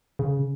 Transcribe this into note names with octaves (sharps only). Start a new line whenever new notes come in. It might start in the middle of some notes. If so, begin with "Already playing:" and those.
C#3